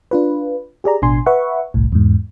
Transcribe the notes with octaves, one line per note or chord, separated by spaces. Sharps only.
D4 F4 B4
G4 G#4 D5 A#5
A1 B2 D4 G#5 C6
B4 E5 F#5 C#6
G1 C2 A2
E2 G#2